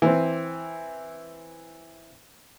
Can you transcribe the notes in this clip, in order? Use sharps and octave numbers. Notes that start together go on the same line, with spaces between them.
E3 C4